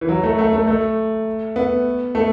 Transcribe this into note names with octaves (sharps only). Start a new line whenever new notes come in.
E3
F#3
A3
A3
A3
A3
B3
A3